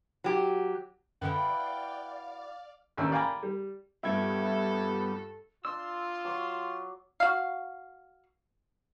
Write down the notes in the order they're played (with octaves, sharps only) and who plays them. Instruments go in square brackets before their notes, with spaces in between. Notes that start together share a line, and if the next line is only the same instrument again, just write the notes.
[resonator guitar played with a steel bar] F#3 G4
[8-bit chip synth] F#2 D3 [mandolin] E4 F#4 B4 [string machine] D5 F5 [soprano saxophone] G5
[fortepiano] A1 D#2 C#4 D4 E6
D5 F5 G5 G#5 A#5 B5
G3
[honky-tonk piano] G2 F4 G5 [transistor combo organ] G3 B3 [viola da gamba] A4 [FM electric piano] E5 G#6
[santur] D4 [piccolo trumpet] F4 [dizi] C6 [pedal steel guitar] E6
[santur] F#3 C#6 D6
[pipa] F#4 F5